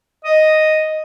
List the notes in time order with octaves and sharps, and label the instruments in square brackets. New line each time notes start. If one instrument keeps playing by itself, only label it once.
[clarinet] D#5